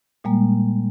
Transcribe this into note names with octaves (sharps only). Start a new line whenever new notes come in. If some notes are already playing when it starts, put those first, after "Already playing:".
A#2 G3 G#3 A#3